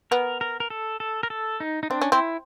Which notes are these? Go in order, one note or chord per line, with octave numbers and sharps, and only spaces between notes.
B3 A#4
A#4
A#4
A4
A4
A#4
A4
D#4
D#4
C4 D4
C#4
C4 E4